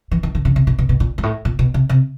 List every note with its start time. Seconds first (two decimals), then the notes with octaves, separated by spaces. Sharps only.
0.11 E3
0.23 D#3
0.35 D3
0.45 C#3
0.56 C3
0.67 B2
0.79 B2
0.89 B2
1.00 A#2
1.18 G#2
1.23 A2
1.45 A#2
1.59 B2
1.74 C3
1.89 C3